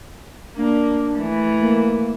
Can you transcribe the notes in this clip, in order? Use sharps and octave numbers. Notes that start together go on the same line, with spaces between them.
A#3 D4
E3 A3
A#3